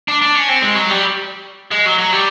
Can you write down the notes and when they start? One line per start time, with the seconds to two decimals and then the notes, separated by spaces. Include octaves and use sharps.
0.08 D4
0.22 D4
0.35 C#4
0.49 C4
0.62 G#3
0.76 F#3
0.90 G3
1.71 G#3
1.85 F#3
1.99 F#3
2.12 G3